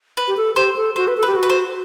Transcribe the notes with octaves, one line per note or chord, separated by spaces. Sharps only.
B4
G4
A4
G4 C5
A4
F#4 C5
B4
A4
B4
G4
F#4
B4
C5